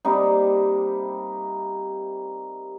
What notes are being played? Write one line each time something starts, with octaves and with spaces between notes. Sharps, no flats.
C3 G3 A#3 D#4